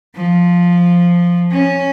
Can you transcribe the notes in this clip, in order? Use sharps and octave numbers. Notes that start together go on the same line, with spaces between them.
F3
C#4